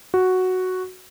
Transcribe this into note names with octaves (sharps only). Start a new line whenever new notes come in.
F#4